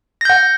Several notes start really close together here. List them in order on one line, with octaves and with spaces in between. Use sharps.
A#6 G6 F#5